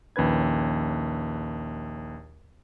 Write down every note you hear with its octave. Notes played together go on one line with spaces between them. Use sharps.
A#1 D#2 C#4 B4 G#6